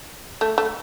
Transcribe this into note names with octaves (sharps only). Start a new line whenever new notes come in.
A3
A3